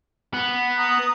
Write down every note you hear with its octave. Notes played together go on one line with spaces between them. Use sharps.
B3
A#5 D#6